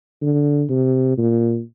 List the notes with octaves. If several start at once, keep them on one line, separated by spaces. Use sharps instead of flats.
D3
C3
A#2